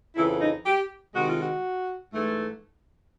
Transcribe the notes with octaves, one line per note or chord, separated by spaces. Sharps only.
F2 C#3 E3 E4
D#4
G4
C3 D#3 G#3 F#4
F4
F#4
G#2 E3 A3